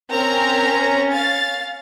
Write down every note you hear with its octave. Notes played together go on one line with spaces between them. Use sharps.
C4 C#4 A#4 A#5
F5 A6